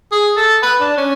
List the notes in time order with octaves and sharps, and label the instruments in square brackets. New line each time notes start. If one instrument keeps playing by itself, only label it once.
[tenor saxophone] G#4
A4
B4
D4
C#4